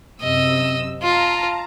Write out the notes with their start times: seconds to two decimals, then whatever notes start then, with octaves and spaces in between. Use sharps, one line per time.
0.22 F#2 C3 D#5 E6
1.03 F4 F5 A5 A#5